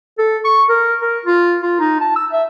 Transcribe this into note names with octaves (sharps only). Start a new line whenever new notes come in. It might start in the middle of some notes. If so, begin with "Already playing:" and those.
A4
C#6
A#4
A#4
F4
F4
D#4
A5
E6
E5